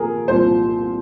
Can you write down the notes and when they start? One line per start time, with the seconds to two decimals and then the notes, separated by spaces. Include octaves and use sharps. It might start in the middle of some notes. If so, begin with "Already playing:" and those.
Already playing: A#2 F3 G#4 A#4
0.28 C2 A#2 F3 C5